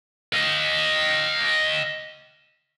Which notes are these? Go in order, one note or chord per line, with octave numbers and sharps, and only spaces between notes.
D#5 F5